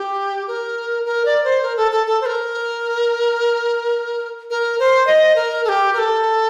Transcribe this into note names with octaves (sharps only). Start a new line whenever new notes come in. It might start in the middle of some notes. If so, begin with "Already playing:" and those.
Already playing: G4
A#4
A#4
D5
C5
A#4
A4
A4
A4
C5
A#4
A#4
C5
D#5
A#4
A4
G4
A#4
A4